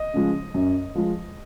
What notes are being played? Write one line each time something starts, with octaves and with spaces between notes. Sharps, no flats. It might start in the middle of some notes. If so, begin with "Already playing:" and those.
Already playing: D#5
C#3 F3 G#3
F#2
F3 G#3